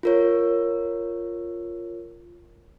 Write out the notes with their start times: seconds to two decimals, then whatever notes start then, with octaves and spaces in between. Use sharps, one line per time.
0.03 F4 A#4 C#5